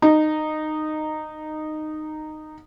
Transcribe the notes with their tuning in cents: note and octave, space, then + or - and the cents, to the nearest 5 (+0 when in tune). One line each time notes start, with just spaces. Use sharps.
D#4 -15